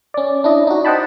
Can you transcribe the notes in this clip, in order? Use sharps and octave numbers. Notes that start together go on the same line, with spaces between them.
C#4 D5
D4 E4 D#5
D#4 F#4
C5 D#5 F#5 G5 A5 B5